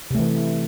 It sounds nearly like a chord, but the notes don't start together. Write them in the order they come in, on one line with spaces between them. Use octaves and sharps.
C3 A3 E3